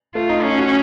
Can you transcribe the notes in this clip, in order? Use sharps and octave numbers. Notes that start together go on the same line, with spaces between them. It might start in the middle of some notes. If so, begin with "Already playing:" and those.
A3 F4
D#4
C#4 D#4
F#4